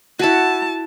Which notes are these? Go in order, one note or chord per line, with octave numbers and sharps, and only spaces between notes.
E4 F#4 A5